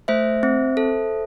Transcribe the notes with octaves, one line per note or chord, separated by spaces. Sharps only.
A3 C5 E5
C4
A4